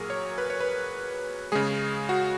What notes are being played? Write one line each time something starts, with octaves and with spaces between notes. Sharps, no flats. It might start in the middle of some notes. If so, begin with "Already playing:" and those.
Already playing: A#2 F#3 F#4 G#4 A#4
C#5
B4
C#5
B4
C#3 G#3 G#4
F#4